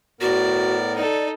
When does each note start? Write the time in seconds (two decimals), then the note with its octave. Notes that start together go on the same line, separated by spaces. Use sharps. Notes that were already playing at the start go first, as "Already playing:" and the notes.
0.21 A2 B3 F#4 A#4 D5
0.97 D#4 A4 D5